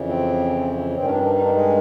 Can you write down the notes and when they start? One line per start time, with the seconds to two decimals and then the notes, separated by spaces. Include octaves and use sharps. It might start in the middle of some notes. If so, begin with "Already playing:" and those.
Already playing: F2 C#3 E3
0.08 C4
0.95 G2 D#3 C4
1.04 C#4
1.09 D4
1.24 D4
1.35 D#4
1.44 D4
1.53 G#3